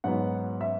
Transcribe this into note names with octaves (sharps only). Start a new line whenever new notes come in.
G#2 F#3 B3 F#5
E5